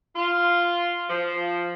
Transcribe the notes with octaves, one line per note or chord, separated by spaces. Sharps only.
F4
F3